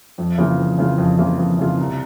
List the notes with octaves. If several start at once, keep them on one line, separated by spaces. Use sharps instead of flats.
F2
C#3 E3 A#3 F4
F2
C#3 E3 A#3 F4
F2
C#3 E3 A#3 F4
F2
C#3 E3 A#3 F4
C2